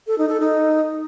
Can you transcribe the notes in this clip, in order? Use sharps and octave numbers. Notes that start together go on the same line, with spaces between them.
A4
D#4
A4
D#4